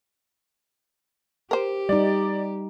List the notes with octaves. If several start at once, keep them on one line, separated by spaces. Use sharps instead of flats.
G4 A#4 C5
G3 D#4 D5